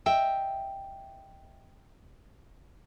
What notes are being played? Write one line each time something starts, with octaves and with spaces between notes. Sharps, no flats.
D#5 E5 G5